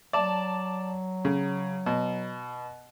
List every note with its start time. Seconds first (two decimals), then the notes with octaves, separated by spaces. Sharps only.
0.13 F#3 D5 A5
1.25 C#3
1.86 B2